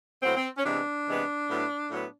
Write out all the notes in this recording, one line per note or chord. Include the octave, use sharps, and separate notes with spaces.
A2 F#3 B3 C4
C4
C#4
C3 E3 G#3 B3 D4
C3 E3 G#3 B3
A2 F#3 B3
A2 F#3 B3